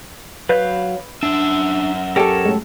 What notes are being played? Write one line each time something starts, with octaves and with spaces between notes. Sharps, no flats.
F#3 B4 F5 G6
F#2 D4 E5
G4 A4 A#4 C#5 A5
A2 G#3